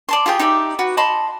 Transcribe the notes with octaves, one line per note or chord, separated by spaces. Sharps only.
D5 A5 C6
F4 G4 G#4 G5
D#4 G4 D5 E5
F#4 B4
D#5 A5 B5 C6